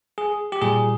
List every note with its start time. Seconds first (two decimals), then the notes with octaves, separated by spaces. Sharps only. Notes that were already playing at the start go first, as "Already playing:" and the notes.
0.18 G#4
0.52 G4
0.61 A#2 G3 G#4